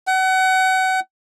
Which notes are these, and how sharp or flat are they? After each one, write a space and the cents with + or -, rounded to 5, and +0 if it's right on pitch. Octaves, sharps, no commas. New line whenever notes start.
F#5 +30